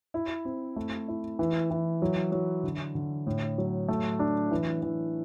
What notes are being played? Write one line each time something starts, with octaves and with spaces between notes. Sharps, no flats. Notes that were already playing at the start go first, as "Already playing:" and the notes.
E4
C4
A3
E4
E3
E3
F#3
F#3
D3
D3
A2
F#3
A3
D4
E3
E3